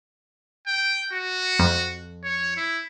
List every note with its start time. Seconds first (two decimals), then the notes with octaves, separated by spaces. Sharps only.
0.67 G5
1.13 F#4
1.59 F2
2.24 C#5
2.57 E4